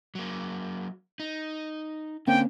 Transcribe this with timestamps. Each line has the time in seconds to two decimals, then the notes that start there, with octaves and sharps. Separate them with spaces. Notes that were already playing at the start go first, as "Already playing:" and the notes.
0.15 F#3 A#3
1.20 D#4
2.27 D3 A#3 C4 C#4 G5